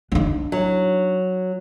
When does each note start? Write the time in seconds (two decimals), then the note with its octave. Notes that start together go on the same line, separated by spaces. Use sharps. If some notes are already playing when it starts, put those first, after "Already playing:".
0.12 D4 D#4
0.52 F#3